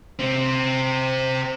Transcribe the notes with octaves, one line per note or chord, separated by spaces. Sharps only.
C3 C4